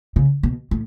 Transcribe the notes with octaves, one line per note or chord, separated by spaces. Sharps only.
C#3
B2
A2